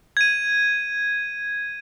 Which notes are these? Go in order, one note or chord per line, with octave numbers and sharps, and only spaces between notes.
G#6 D#7